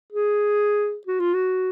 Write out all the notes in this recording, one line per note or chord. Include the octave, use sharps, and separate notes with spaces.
G#4
F#4
F4
F#4